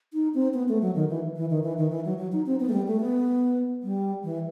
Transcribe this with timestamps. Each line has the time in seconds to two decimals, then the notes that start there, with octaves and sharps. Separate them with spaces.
0.14 D#4
0.34 C4
0.54 B3
0.69 A3
0.82 F#3
0.95 D#3
1.10 E3
1.36 E3
1.50 D#3
1.63 E3
1.77 D#3
1.91 E3
2.05 F#3
2.18 F#3
2.32 D#4
2.46 C4
2.60 B3
2.69 A3
2.73 G3
2.87 A3
3.00 B3
3.83 G3
4.24 E3